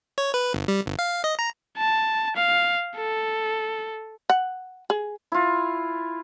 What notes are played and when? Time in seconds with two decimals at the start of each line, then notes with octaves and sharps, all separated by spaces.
0.18 C#5
0.34 B4
0.54 G1
0.68 G3
0.86 G1
0.99 F5
1.24 D#5
1.39 A#5
1.77 A5
2.36 F5
2.96 A4
4.30 F#5
4.90 G#4
5.32 E4 F4